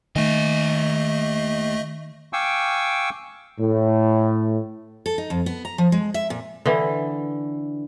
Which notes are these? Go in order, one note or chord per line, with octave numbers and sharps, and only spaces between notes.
D#2 D#3 A3 D#5 G#5
F5 G5 G#5 C#6 D6 E6
A2
A4
D#4
F2
B3
A#5
F3
G#3
E5
A#2
D3 E3